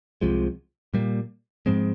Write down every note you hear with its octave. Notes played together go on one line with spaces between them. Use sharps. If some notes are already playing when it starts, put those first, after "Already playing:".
C2 C3 F3 G#3
A#2 G3 A#3
G#2 F3 G#3 C4